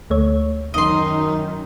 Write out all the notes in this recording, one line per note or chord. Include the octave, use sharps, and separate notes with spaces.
D2 A3 C#5
F#2 D#3 D#4 D#5 C6